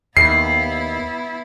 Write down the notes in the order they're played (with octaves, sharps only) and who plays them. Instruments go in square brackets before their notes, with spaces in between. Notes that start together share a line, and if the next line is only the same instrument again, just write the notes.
[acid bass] D#2 [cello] B3 E4 [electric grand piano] C7